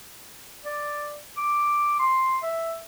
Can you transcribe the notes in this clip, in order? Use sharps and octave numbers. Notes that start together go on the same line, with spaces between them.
D5
D6
C6
E5